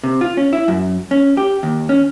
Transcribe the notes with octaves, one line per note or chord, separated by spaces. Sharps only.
C3
F4
C#4
E4
F#2
C#4
G4
D#2
C#4